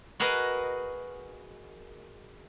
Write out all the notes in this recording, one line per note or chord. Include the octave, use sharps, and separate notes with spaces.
F#4 G#4 A#4 B4 D#5